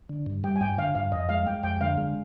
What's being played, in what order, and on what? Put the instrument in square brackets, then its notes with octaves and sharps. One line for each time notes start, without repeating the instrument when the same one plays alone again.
[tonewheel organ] D3
G2
[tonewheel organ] G3 [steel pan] G5
[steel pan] G#5
[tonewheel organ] G2 [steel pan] G5
[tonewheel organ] D3 [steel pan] F5
[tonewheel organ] G2 [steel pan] F5
[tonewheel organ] F2 [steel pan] D#5
[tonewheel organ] G#3 [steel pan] F5
[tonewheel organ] G#3 [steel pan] G5
[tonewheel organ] F2 [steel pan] G5
[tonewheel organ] D3 [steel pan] F5
[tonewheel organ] G#3